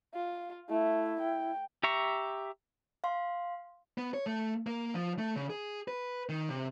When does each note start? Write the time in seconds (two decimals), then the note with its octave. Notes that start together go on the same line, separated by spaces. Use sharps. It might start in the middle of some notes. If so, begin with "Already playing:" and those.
0.14 F4
0.69 A3 E4
1.20 G5
1.83 G4 E5 A#5 C#6
3.04 F5 C6
3.98 B3
4.14 C#5
4.26 A3
4.67 A#3
4.94 F3
5.18 A3
5.36 C#3
5.50 G#4
5.88 B4
6.29 D#3
6.49 C3